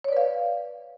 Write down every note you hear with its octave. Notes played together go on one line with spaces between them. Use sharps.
B4 C#5 D5 F5